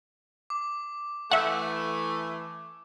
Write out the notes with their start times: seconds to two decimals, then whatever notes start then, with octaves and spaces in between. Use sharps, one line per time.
0.50 D6
1.31 E3 A3 E5 F#5